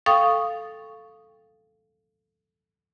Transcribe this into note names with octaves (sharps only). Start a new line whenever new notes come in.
A4 F5 G5 C#6 D#6